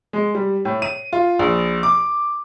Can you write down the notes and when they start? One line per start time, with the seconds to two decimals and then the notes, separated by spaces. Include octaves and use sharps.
0.13 G#3
0.35 G3
0.65 A2
0.82 D#7
1.13 F4
1.39 A#1
1.83 D6